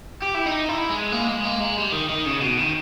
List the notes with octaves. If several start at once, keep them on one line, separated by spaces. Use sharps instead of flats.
G4
E4
D#4
E4
G#3
A#3
G#3
A#3
G#3
G3
D#3
D#3
C#3
B2
D#3